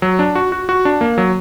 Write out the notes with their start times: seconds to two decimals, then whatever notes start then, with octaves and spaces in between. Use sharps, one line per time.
0.02 F#3
0.19 D4
0.35 F#4
0.52 F#4
0.69 F#4
0.85 D4
1.01 A#3
1.18 F#3